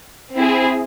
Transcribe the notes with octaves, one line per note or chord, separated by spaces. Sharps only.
C4 E4 G#4